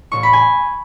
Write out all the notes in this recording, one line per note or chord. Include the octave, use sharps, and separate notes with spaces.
A1 C#6
B5
G#5